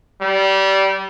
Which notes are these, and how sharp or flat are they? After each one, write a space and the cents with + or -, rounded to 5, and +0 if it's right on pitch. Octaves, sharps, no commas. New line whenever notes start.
G3 -20